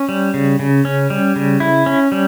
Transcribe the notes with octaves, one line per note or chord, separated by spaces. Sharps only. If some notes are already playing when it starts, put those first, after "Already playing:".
Already playing: C#4
G3
C#3
C#3
C#4
G3
C#3
E4
C#4
G3